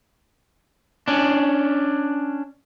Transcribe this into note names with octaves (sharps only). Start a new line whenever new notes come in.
C#4 D4